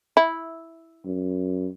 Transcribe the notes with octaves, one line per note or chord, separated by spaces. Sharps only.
E4
F#2